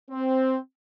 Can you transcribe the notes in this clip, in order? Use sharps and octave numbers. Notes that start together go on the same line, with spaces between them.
C4